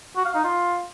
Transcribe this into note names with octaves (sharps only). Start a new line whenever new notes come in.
F#4
F5
D#4
F4